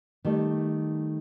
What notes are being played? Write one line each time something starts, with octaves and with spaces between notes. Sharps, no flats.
D#3 G3 A3